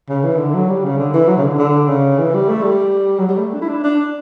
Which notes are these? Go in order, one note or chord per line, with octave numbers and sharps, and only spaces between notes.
C#3
E3
D3
F#3
G3
C#3
D3
E3
F#3
C#3
D3
D3
C#3
E3
G3
A3
G3
F#3
G3
A3
D4
E4
D4
D4